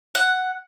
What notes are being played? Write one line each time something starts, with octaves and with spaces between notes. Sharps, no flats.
F#5